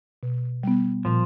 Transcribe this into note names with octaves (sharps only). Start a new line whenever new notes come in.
B2
G3 B3
A#2 F3